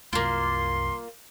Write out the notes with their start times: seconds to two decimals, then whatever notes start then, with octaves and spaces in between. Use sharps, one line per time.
0.13 C2 F#2 A#3 F4 C6